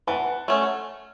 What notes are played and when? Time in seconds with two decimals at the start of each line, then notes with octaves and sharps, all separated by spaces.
0.07 E3 F#5 A5
0.48 A3 C#4